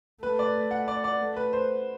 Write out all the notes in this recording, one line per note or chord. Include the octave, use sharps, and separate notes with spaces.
A3 B4
D5
F#5
D5
D5
A3
B4
C5